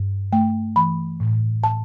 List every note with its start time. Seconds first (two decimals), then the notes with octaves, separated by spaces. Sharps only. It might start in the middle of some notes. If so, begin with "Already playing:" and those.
Already playing: G2
0.33 A3 G5
0.76 E3 B5
1.20 A2
1.64 A2 A5